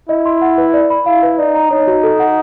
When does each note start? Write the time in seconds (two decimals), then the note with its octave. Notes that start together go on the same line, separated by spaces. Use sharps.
0.09 E4 D#5
0.26 C6
0.42 F#5
0.58 B4
0.74 D5
0.90 B5
1.06 E4 F5
1.23 B4
1.38 D#4 D5
1.55 A#5
1.71 D#4 C#5
1.87 F#4
2.03 A4
2.20 F#5